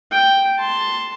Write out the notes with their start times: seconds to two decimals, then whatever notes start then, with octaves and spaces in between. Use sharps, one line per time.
0.12 G5
0.59 A5 C6